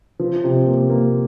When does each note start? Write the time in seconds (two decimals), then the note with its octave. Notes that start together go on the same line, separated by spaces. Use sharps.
0.20 F3
0.44 C3
0.66 A#3
0.90 A#3